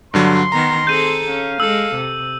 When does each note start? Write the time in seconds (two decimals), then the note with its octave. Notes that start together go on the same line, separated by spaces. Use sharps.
0.14 G2 D3 F#3 C6
0.52 D#3 B3 A#4 A#5
0.87 C4 G#4 A4 G6 D#7
1.29 C#4 F5
1.60 G#3 A4 E6
1.95 C3